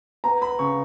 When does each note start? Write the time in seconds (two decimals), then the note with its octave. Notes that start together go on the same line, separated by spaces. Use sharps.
0.24 B3 A#5
0.42 B5
0.59 C#3 C#6